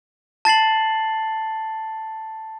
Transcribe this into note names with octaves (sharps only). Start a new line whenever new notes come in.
A5 A6 C7 F#7